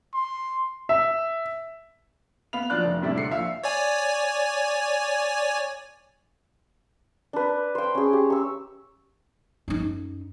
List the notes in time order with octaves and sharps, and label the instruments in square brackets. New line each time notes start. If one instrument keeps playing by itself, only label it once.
[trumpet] C6
[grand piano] E5
[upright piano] B3 F5 B5 F7
F3 F#3 D4 D5 F#6
F1
A2 C3 G3 D4 E4
D3 C7 C#7
A#1 E5 F5
[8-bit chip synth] C#5 D5 G#5
[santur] D4 B4
C5 G5
C#4 G#4
G4
C#6 E6
[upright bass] F#2 D#4